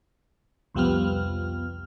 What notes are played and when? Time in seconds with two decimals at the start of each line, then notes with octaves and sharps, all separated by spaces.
0.75 C2 F2 F3 G3 B3 F6